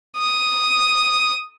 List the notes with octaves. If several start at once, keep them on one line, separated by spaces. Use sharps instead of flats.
D#6